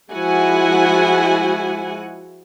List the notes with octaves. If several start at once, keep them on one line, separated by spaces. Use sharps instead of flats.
F3 G#3 E4 F#4 F#5 G#5